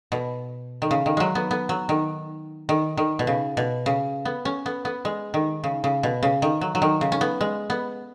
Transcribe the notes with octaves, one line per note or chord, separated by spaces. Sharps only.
B2
D#3
C#3
D#3
F#3 G#3
B3
B3
F#3
D#3
D#3
D#3
B2
C#3
B2
C#3
B3
C#4
B3
B3
G#3
D#3
C#3
C#3
B2
C#3
D#3
F#3
F#3
D#3
C#3
C#4
B3
G#3
B3